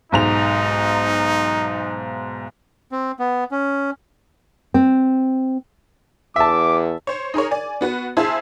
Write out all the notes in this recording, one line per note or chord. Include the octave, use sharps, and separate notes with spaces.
B1 G#2 D#4 F7
C4
B3
C#4
C4
E2 E5 A5 D6
C5 C#5
D#4 G#4 A#4 C#5
D5 G#5
B3 F#4 B4
E4 G#4 C5 E5 F5 A5